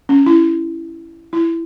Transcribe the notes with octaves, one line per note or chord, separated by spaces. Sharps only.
C#4
E4
E4